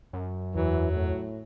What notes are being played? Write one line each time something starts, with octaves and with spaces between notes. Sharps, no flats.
F#2
E2 E3 F#3
A2